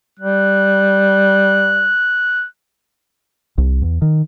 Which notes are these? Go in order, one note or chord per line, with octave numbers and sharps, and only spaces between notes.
G3 F#6
C2
E2
D#3